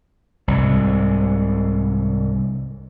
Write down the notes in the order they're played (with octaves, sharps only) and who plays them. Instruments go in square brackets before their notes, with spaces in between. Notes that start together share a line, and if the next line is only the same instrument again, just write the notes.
[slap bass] C2 G#2 C3